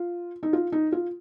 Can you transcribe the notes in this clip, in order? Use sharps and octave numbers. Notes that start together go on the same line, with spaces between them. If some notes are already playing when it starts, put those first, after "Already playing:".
Already playing: F4
D#4
F4
D#4
F4